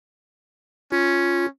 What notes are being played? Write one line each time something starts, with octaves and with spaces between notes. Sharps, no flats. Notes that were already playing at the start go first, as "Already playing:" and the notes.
C#4 F4